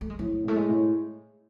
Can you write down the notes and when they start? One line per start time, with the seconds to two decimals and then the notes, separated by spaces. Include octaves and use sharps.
0.01 A3
0.10 G#3
0.19 A2 F#3
0.44 A2 A3
0.56 G#3
0.69 A2